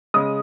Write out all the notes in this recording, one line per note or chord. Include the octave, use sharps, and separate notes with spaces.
C#3 G#3 D#6